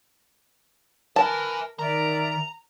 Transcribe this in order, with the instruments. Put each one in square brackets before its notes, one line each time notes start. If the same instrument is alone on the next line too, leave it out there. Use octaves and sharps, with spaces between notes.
[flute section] A#4 B4 [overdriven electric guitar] E5 G#5 [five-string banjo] A5
[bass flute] D#3 [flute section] A#4 D5 E5 [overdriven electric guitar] A#5